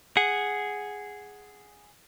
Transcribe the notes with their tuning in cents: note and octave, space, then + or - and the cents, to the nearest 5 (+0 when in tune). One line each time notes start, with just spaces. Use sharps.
G#4 +0 F#5 +0